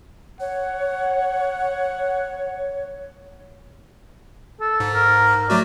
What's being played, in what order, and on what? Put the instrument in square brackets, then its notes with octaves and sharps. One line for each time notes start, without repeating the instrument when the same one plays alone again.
[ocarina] C#5 [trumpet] F#5
[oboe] A4
[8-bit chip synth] G#2
[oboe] A#4
[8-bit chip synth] F#3 A3 F#4 [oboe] D5